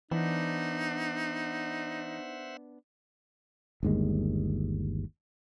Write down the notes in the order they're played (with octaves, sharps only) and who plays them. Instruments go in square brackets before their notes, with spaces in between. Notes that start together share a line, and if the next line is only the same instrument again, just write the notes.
[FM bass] E3 [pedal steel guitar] B3 D4 [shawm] D#4 [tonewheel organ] C5 E5 F#5
[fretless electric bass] G1 D#2 G#3